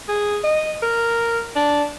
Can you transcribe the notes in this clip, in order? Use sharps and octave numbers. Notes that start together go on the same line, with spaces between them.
G#4
D#5
A#4
D4